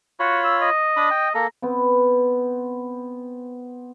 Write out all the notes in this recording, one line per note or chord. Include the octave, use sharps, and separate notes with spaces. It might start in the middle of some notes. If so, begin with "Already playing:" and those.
F4 F#4 C#5 B5
E6
D#5
D4 B5 D#6
G5
A#3 A4 A#5
B3 C4